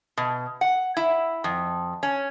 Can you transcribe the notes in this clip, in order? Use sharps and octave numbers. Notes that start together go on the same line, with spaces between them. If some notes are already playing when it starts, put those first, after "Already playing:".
B2
F#5
E4
F2
C#4